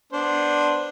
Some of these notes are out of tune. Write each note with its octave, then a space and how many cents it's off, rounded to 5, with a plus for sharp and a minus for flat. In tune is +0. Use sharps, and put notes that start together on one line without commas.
B3 +0 D4 +0 C5 +0